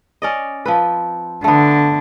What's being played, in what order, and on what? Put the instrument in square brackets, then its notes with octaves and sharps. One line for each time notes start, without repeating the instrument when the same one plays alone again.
[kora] C#4 D5 D#5
F3 C4 B4
[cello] D3 [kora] A3 B3